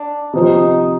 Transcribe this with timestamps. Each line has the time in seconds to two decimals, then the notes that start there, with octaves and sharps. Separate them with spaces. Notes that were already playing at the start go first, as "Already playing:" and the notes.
Already playing: D4
0.33 C3 F3 C4 D#4